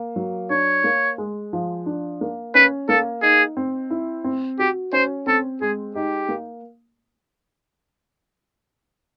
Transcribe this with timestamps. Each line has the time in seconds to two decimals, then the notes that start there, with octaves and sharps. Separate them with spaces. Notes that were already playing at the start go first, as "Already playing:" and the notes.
Already playing: A#3
0.16 F#3
0.50 D4 C#5
0.84 A#3
1.18 G#3
1.53 F3
1.86 D4
2.21 A#3
2.55 C#4 B4
2.89 A#3 A4
3.22 D#4 G#4
3.57 C4
3.90 E4
4.24 C4
4.59 F#4 G4
4.93 C#4 C5
5.26 C4 A4
5.61 G#3 G#4
5.95 D#4 G4
6.29 A#3